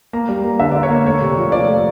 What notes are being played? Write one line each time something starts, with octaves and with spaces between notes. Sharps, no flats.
A#3 A#5
G3
A#3
D3 E5
D5
D3
C#5
A#3
A3 C#5
C3
F3
F3 D5
A3